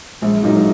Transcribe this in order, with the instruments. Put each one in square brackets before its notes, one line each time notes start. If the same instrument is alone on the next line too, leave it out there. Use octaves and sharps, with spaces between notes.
[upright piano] A#1 [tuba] G#3
[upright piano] A#2 F#3 A#3 D#4